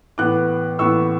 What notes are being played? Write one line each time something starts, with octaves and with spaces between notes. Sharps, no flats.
A2 E3 B3 D6 F#6
A2 E3 B3 C#6 E6